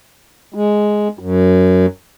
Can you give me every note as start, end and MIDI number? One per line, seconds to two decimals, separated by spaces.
0.54 1.08 56
1.19 1.86 42